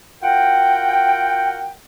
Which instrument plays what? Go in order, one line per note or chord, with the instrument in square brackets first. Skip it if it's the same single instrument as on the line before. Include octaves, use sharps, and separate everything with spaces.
[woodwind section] F4 F#4 A#4 F#5 G5